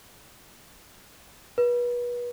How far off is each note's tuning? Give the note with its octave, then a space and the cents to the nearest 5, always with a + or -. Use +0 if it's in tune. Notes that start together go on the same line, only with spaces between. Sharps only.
B4 -30